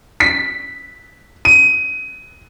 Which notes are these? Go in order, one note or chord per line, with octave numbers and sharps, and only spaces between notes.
B6
D#7